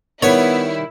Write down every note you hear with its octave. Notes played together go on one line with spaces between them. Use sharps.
D#3 G3 B3 E4 C#5